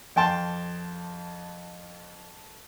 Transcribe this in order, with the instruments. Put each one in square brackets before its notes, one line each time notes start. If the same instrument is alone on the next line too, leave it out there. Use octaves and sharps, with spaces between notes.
[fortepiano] F2 G5 A5 C6